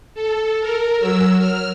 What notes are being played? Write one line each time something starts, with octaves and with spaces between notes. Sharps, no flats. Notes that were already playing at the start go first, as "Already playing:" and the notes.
A4
A#4
F#3 E6
F6